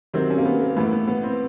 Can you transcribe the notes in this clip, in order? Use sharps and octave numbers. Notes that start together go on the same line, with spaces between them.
C3 D#3 F#3 C4
C#4
A#3
B3
A#3
A2 E3 B3
B3
B3
C4